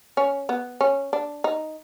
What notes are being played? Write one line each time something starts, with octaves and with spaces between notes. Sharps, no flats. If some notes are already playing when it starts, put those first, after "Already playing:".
C#4
B3
C#4
D4
D#4